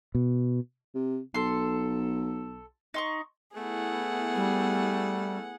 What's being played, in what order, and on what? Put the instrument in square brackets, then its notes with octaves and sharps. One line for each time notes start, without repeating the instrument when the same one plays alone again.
[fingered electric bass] B2
[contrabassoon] C3
[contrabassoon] B1 [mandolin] A4 C6
[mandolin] D#4 C6 C#6
[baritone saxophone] A3 [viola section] B3 E4 [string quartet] G#4 F#5
[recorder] G3